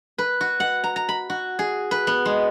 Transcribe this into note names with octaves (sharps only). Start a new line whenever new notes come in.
B4
F#4
F#5
A#5
A#5
B5
F#4
G#4
B4
B3
G#3